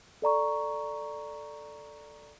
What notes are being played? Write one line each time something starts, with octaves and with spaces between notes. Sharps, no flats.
A4 D5 A#5 C#6